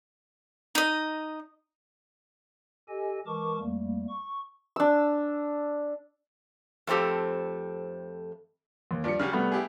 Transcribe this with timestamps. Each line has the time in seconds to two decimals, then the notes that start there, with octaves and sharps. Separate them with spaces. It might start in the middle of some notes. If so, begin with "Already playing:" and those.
0.75 D#4 D#5
2.88 G4 A4 D#5 G#5
3.27 E3 G#3 A#4 A5 C#6 D6
3.59 F2 G3 A3 A#3
4.08 C#6
4.76 D4 E6
6.87 F2 A3 C4 G4 A4
8.91 D#2
9.04 G2 F3 D5 C#7
9.19 C#3 F#3 G3 F6
9.33 C2 G3 A3 B3
9.52 E4 G4 G#4